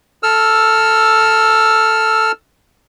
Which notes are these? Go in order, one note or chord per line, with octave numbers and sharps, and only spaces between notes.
A4 E6 F6